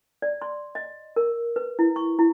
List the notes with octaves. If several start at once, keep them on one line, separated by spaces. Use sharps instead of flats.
D5
C6
D#5
A#4
B4
E4
C#6
E4